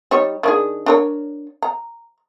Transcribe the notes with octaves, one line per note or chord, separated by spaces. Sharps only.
G3 D#4 C#5
D#3 D4 G#4
D4 A#4 C#5
A#5